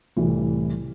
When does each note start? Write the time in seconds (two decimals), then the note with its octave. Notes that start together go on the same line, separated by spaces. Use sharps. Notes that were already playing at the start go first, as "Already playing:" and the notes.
0.16 C2 A2 C3 E3